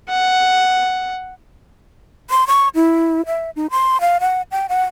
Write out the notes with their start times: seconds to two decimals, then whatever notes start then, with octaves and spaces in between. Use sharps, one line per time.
0.10 F#5
2.30 C6
2.48 C#6
2.75 E4
3.26 E5
3.56 D#4
3.71 C6
4.01 F5
4.20 F#5
4.51 G5
4.69 F#5